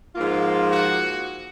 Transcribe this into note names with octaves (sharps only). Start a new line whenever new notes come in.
G#2 F3 A#3 F4
F#4